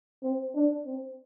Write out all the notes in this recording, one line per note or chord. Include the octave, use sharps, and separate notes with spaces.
C4
D4
C4